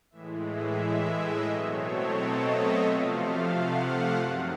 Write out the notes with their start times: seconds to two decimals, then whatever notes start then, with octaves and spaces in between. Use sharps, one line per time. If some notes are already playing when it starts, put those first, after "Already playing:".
0.10 A2 E3 G#3 E5
0.44 E5
1.12 D#5
1.46 B2 F#3 A3 C4 C#5
1.79 A4
2.14 D#5
2.47 E5
2.81 C3 F3 A3 F5
3.48 F#5
4.17 F#2 D#3 F#3